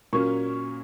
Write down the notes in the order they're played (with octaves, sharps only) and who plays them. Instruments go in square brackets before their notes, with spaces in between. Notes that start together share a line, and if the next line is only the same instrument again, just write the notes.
[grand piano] A#2 F#3 A#3 C#4 C#6